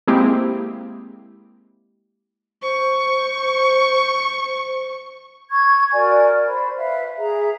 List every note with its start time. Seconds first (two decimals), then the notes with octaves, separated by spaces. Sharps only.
0.07 G#3 A#3 C4 E4 G4
2.62 C5 C#6
5.50 C#6 G#6
5.92 F#4 A#4 D5 G#5
6.47 C5 D5 B5
6.76 B4 E5 F5
7.16 G#4 E5 A#5